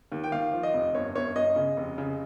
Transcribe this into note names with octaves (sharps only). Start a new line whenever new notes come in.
D#2
G5
D#2 F5
F3
D#5
F1
G1 C#5
G1 C#5
G1 D#5
C#3
F1
C#3